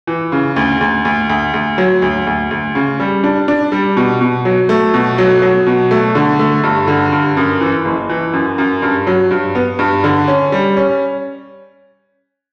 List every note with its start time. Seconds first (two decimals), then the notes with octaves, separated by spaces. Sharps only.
0.07 E3
0.32 C#3
0.56 D2
0.81 D2
1.05 D2
1.29 D2
1.54 D2
1.78 F#3
2.02 D2
2.27 D2
2.51 D2
2.75 C#3
3.00 G3
3.24 D4
3.48 D4
3.72 G3
3.97 B2
4.21 B2
4.45 F#3
4.69 A3
4.94 B2
5.18 F#3
5.42 F#3
5.66 B2
5.91 A3
6.15 D3
6.39 A3
6.64 G2
6.87 D3
7.12 G2
7.37 F#2
7.61 E3
7.85 F#1
8.09 E3
8.33 F#2
8.58 F#2
8.82 G2
9.07 F#3
9.31 G2
9.55 B3
9.79 G2
10.04 D3
10.28 C#4
10.52 G3
10.77 C#4